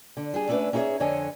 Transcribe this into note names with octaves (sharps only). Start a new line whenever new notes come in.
D3
G3 D4 G#4
A3 C#4 D4 G#4 B4 E5
C#4 D#4 E4 G#4 C#5 E5
F2 D3 C#5 D#5 G#5 A5